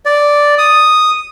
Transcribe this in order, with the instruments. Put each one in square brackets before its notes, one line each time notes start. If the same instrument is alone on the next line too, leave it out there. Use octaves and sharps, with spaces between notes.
[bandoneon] D5
D#6